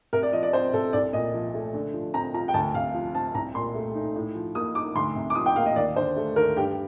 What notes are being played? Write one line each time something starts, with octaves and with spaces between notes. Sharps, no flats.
C3 A#4
D5
F3 D#5
D5
C4 C5
C3 A4
C2 D5
A#2 D#5
F3
A3
D3
F3
C4 A#5
F4 A#5
G5
D2 A5
C3 F5
F3
C4 A5
C2 A#5
A#2 C6
A3
D#4
A2
F3
A#3 D#6
D#4 D6
D2 C6
C3
D6
F3 D#6
G5
A#3 F5
D#5
D#2 D5
D3 C5
A3
D#2 A#4
G2 G4